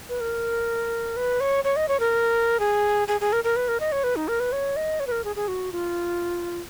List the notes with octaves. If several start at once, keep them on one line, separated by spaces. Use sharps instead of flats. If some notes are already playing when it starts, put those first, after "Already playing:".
B4
A#4
B4
C#5
C#5
D#5
C#5
A#4
G#4
G#4
G#4
A#4
A#4
B4
A#4
D#5
C#5
B4
D#4
A#4
B4
C#5
D#5
C#5
B4
A#4
G#4
G#4
F#4
F4